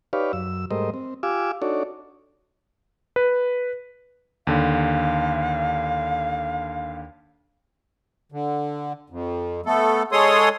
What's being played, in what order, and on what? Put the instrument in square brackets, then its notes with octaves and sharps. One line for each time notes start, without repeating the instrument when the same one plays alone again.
[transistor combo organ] D#4 G4 B4 C#5 D5 F5
F#2 E6
G#2 G3 A3 A#4 C5 D#5
C4
F4 G4 F5 G#5 D6 E6
D4 D#4 F#4 A4 C#5 D5
[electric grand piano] B4
[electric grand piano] D#2 D3 [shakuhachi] F5
[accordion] D3
F2
A3 B3 A4
G#3 G#4 A4 C#5 C6 D#6